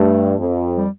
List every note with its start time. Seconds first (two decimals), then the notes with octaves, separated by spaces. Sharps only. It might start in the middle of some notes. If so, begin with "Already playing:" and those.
Already playing: G2 A3
0.39 F2
0.77 G3